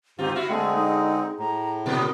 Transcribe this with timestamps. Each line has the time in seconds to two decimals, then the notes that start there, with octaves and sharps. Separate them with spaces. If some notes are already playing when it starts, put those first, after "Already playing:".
0.19 D#2 G#2 C4 F4 G4
0.35 E4 F#4 E5 F5
0.49 D3 G#3 A3 C4 G#4
0.75 D#4
1.39 A2 A#5
1.86 B2 F#3 B3 A#4